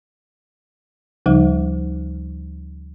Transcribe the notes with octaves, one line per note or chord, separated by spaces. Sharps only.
D2 C#3 F3 G3 D#4